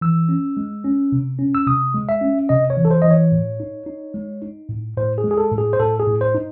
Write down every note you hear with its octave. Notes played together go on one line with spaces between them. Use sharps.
E3 E6
C#4
G#3
C#4
C3
C#4
E6
C3 D#6
G#3
E5
C#4
C3 D#5
C#5
E3
A4
C5
E3 D#5
C#5
A2
D#4
D#4
G#3
D#4
A2
A2 C5
G#4
G#3
G#4
A4
A2
G#4
C5
A2 A4
G#4
A2
C5
D#4